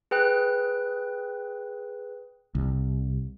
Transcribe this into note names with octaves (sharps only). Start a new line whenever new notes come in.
G#4 B4 G5 F#6
C2